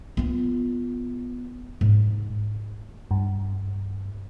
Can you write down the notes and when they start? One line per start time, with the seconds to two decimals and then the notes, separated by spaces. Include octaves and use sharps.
0.17 B3 F4
1.81 G#2
3.11 G2